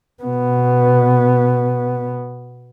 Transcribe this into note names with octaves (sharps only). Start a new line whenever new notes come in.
B2 B3